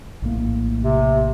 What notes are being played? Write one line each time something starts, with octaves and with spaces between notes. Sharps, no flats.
A#1 A2 A#3
C3